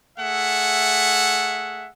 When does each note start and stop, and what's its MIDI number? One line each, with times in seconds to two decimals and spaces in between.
0.19 1.89 57
0.19 1.89 68
0.19 1.89 76
0.19 1.89 78